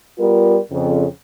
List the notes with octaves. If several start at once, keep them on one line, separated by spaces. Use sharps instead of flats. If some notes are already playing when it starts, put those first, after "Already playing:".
G3 B3 F4 A#4
F2 C#3